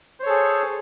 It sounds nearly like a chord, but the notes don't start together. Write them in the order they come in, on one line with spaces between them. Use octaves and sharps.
C5 C#5 A4 G#4